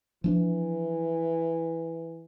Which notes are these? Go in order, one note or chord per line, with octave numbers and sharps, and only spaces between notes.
E3 F3 C#4 D4